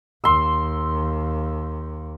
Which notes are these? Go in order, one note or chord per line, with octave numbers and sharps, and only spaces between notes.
D#2 C6 E6